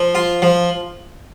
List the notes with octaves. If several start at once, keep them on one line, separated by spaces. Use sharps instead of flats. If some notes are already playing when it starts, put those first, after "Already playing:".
Already playing: F3
F4
F3